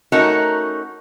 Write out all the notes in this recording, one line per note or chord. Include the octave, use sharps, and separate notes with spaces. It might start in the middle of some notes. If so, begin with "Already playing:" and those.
A3 C#4 D#4 F#4 A#4